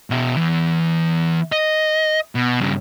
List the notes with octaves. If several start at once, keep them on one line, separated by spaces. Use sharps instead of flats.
B2 E5
E3 B3
D#5
B2
G2 C#3